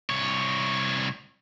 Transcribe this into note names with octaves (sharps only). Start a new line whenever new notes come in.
C2 C#5